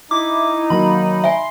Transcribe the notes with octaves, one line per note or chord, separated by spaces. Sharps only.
D#4 E4 D6
D#3 F#3 A#3 B5
E5 G#5 C6